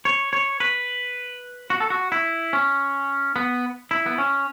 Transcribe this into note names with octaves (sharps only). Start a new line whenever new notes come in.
C#5
C#5
B4
F#4
A4
F#4
E4
C#4
B3
E4
B3
C#4